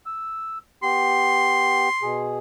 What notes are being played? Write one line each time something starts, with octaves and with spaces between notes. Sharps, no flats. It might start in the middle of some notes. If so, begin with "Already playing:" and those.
E6
B3 G4 C6
B2 G#4